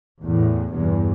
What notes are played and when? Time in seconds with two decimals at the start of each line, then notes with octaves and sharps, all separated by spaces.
0.23 E2 A2
0.71 E2 G2 B2